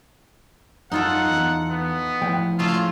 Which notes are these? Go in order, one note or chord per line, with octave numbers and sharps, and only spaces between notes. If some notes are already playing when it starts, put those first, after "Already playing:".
F#2 D#4 F4 A4 F#5
E2
B3
A2 F3 G5
C#3 A3 F4 G#4